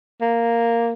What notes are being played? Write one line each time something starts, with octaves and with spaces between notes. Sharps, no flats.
A#3